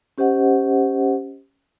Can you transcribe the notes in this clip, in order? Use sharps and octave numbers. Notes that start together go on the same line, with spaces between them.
C#4 G4 C5 D#5 F#5